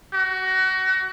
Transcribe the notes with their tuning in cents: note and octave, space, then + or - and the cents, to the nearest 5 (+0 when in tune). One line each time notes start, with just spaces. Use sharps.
F#4 +25